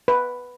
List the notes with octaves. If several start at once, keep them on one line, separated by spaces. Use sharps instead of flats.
B4